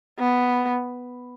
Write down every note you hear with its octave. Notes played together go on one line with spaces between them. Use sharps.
B3